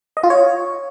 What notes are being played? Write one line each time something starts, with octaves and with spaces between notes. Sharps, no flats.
D#5
F4
C#5